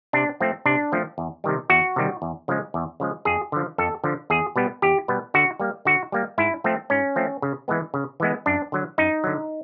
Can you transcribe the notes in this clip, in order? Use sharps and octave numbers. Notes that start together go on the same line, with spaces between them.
C3 D4
F3 A3 C4
C3 D4
F3 A3 C4
E2
C3 D#3 G3
E2 F#4
C3 D#3 G3
E2
C#3 F3 G#3
E2
C#3 F3 G#3
F2 G#4
D3 F3
F2 A4
D3 F3
E2 G#4
B2 G3 B3
E2 G4
B2 G3 B3
D3 F#4
G3 A#3
D3 F#4
G3 A#3
G#2 E4
F3 A3 C4
G#2 C#4
F3 A3 C4
C#3
E3 G#3 B3
C#3
E3 G#3 B3
F#2 D4
D3 F#3
F#2 D#4
D3 F#3